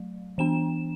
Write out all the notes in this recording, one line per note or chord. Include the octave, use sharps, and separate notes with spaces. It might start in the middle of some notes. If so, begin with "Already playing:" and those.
Already playing: F#3 A3
E3 B3 D4 E7